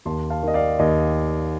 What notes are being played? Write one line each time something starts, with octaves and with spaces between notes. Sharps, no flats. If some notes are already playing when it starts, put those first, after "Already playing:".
D#2 A5 C6
F5 A5
D#3 D#5
D5 F5
D#2 D#5